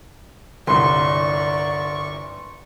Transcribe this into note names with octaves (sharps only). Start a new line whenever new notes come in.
G1 C2 D5 C6 C#6